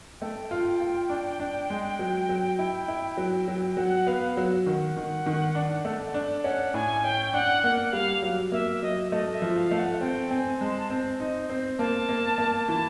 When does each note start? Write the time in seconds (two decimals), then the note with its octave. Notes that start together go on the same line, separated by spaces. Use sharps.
0.21 A3 G5
0.51 F4
0.80 F4
1.10 D4
1.40 D4
1.70 G#3
1.99 F#3
2.29 F#3
2.59 E4
2.88 E4
3.17 F#3
3.48 F#3
3.77 F#3 F#5
4.07 B3 F5
4.37 F#3 F#5
4.66 D#3 F#5
4.96 D#3
5.26 D#3
5.55 D4
5.85 A3
6.14 D4
6.44 C#4 F#5
6.74 A2 G#5
7.04 C#4 G5
7.33 D4 F#5
7.63 A#3 F#5
7.92 G3 F5
8.22 F#3
8.52 A#3 E5
8.71 E5
8.82 F#3 D#5
9.12 A3 D#5
9.34 E5
9.42 F3
9.57 F5
9.71 A3
9.79 F#5
10.00 C4 G5
10.31 C4 G#5
10.60 G#3 A5
10.90 C4
11.20 D#4
11.50 C4
11.79 A#3 A5
12.09 A#3
12.38 A#3
12.68 E3 A5